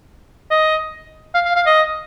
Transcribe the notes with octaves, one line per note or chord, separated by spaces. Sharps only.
D#5
F5
F5
F5
D#5